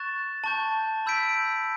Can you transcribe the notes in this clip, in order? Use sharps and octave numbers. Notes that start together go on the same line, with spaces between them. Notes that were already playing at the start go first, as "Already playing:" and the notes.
Already playing: C#6 F#6 A6 E7
A5 C#6 G6
B5 E6 G6 B6 D7